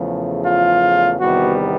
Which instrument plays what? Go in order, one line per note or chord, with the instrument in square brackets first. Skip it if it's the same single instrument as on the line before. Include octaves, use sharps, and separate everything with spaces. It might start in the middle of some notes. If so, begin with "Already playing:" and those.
Already playing: [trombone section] E2 C#3 F3 A3
F4
E2 C3 D#3 G3 B3 F#4